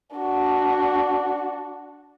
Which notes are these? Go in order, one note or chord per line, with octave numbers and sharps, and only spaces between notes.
D4 F#4